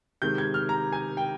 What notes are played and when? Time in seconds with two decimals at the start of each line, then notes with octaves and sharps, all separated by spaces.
0.22 C3 D#3 G#3 G6
0.38 G#6
0.54 F6
0.69 A#5
0.93 G#5
1.17 G5